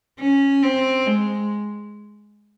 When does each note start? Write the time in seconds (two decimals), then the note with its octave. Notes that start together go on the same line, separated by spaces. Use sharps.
0.20 C#4
0.63 C4
1.06 G#3